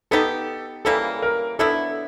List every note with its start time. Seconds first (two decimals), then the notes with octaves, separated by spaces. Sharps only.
0.11 B3 D#4 G4 A4
0.85 C#3 E3 G3 A#3 A4
1.22 A#4
1.59 D3 F#3 B3 E4 A4